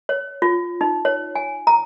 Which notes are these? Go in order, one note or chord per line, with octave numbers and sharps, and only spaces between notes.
C#5
F4
D#4
C#5
G#5
A#5